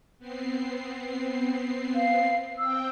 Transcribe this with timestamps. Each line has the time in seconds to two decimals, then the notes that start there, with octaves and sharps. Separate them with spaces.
0.19 B3 C4 C7
1.95 F5
2.59 C4 G5 E6